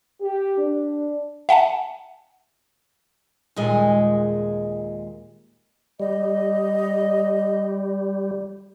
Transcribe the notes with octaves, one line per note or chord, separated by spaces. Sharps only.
G4
D4
E5 F#5 G#5 A5
D#2 A#2 G#3
G3 D#5